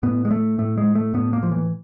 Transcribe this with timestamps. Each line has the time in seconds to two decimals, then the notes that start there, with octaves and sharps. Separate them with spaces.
0.03 A2 B3
0.25 G#3
0.31 A3
0.58 A2 A3
0.78 G#3
0.95 A3
1.14 A2 B3
1.33 A#3
1.43 F3
1.52 E3